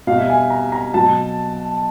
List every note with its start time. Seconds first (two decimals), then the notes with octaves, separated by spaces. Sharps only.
0.07 B2 G3 F5
0.18 E5
0.30 G#5
0.50 A#5
0.72 A#5
0.94 B2 F#3 A5